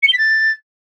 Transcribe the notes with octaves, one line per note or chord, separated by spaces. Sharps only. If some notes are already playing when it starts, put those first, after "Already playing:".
C#7
G7
B6
A6